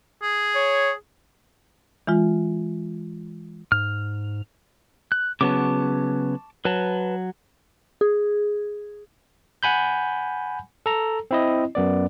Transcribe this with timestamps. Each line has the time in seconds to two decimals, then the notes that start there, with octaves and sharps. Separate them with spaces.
0.22 G#4
0.55 C#5
2.07 E3 G#3 F4
3.72 G#2 F6
5.12 F#6
5.41 C#3 F#3 B3 A5 C#6 D6
6.65 F#3 B4 A5
8.01 G#4
9.63 F#5 G#5 B5 G6
10.86 A4 A#5
11.31 C4 E4 D#5
11.75 F#2 B3 D5